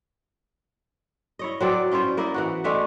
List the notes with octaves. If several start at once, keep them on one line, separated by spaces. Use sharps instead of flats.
E4 C#5 D#5
F#3 C4 D5
C#4 E4 F4 C5
A#3 E4 D#5
E3 B3 F#4
G#3 A3 D4 E5